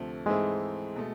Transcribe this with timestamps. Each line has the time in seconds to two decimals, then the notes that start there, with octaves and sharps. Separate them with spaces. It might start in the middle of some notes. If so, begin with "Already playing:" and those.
Already playing: D2 C3 F3 A3
0.26 G#2 E3 G#3 A3 C4 E4
0.96 B2 A3